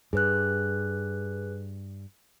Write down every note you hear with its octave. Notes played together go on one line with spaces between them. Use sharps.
G2 G#4 B4 F#6